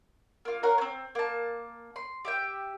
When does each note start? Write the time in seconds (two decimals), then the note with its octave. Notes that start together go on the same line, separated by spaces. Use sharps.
0.45 A#3 F4
0.63 A#4 C#5 F5 F#5
0.78 C4 C#4
1.15 A#3 A5
1.96 C6
2.25 G4 E5 G5